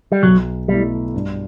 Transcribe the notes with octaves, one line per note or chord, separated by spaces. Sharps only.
G3
B1 F#3
B2 G3 A3 E4
G2